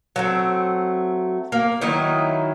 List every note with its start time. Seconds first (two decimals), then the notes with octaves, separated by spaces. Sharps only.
0.16 F#3 A3 C4
1.52 A#3
1.81 D#3 F#3 D#4 E4